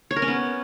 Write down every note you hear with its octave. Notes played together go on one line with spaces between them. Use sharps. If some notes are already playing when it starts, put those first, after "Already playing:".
C#5
A#4
C#4
B3